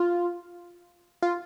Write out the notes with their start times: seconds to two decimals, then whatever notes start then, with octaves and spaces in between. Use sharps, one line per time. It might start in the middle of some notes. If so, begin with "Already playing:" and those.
Already playing: F4
1.22 F4